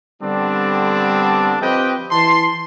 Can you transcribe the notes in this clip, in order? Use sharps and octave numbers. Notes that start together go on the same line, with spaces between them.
D3 G3 B3 C4 D4
F3 C4 G4 B4 D#5 G5
E3 A5 C6